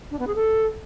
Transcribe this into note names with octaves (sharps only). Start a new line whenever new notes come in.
D4
B3
G#4
A4